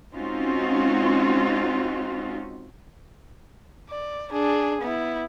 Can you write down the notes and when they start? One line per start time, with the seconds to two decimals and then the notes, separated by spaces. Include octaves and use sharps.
0.15 G#3 C4 C#4 D#4 F4 F#4
3.90 D5
4.32 D4 G#4
4.82 B3 E4